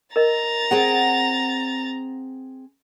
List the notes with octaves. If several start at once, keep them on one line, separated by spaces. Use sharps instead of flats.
A#4 D#5 A#5 A6
C4 G#4 F#5